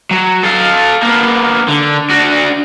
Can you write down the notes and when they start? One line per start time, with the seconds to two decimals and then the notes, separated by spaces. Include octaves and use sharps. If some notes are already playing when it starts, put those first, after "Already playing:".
0.11 F#3
0.43 A4 F5
1.03 A#3 B3
1.68 D3
2.09 D4 F#4